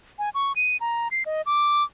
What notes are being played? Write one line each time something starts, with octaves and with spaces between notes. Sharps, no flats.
G#5
C#6
D#7
A#5
C7
D#5
D6